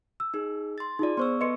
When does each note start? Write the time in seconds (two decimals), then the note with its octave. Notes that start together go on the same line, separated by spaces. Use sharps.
0.20 E6
0.34 D#4 G#4
0.78 C6 A6
0.99 D#4 F4 G#4 D5
1.17 B3 C5 C6 C#6 E6
1.41 A4 B4 D#5 C6 C#7